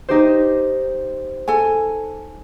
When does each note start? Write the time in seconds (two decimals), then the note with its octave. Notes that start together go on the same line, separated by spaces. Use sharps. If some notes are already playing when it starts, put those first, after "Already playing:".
0.09 D#4 G4 C5
1.48 A4 G#5